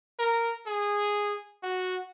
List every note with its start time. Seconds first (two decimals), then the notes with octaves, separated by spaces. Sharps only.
0.19 A#4
0.67 G#4
1.63 F#4